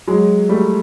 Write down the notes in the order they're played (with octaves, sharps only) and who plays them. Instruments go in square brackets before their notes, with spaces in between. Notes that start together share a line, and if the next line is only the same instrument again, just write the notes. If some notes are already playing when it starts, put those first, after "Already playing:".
[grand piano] F#3 G#3
G3 A3